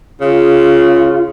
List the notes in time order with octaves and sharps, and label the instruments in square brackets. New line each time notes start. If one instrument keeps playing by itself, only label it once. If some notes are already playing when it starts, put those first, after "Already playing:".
[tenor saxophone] C#3 [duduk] F4